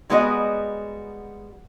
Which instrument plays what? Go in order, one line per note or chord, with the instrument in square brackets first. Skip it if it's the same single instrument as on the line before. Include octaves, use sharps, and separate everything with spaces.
[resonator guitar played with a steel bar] G3 G#3 B3 F#4 A#4 D#5